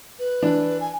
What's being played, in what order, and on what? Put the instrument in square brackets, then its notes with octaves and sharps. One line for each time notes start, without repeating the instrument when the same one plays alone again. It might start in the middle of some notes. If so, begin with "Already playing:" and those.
[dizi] B4
[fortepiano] E3 D4
[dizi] G#5